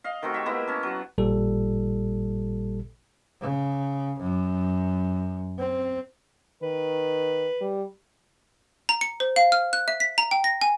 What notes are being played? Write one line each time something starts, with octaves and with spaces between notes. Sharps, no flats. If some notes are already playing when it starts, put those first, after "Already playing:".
D#5 F5
D#3 A3 C4 F#4
G4 E5
G#3 A#3 B3 E4
C#4 A5
F#3 F#5
A1 A#2 G3 A4
C#3
F#2
C4
D#3 B4
G3
A#5
C#7
C5
F5
F6
F#6
E5
B6
A#5
G5
A#6
G#5